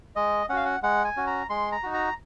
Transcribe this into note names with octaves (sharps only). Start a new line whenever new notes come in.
G#3 D#5
C#4 F#4 F5 F#5
F#5
G#3 F#5
G#5
C#4 F#4
A#5
G#3 C6
A#5
D#4 F#4
A#5